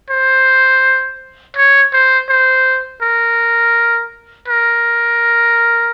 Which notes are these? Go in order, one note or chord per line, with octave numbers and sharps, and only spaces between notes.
C5
C#5
C5
C5
A#4
A#4